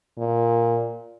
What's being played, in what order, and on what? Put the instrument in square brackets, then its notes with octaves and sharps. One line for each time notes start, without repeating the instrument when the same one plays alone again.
[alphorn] A#2